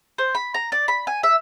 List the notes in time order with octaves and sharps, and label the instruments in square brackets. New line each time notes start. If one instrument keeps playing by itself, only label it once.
[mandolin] C5
B5
A#5
D5
B5
G#5
E5